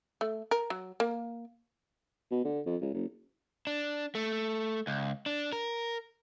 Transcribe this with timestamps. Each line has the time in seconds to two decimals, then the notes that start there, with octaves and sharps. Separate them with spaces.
0.21 A3
0.51 A#4
0.70 F#3
1.00 A#3
2.31 B2
2.44 D3
2.66 F2
2.81 C#2
2.94 F#1
3.67 D4
4.15 A3
4.87 C#2
5.26 D4
5.53 A#4